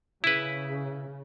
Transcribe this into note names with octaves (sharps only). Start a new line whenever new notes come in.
C#3 E4 B4